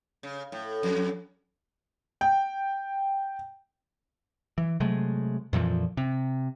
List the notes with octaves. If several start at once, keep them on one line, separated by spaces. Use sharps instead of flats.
C#3
A2
F2
G5
E3
C3 F#3 G#3 A3
F2 A#2 E3 F3
C3